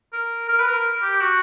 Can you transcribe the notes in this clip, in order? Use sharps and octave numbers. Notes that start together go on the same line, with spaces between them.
A#4
A#4
B4
A#4
G4
F#4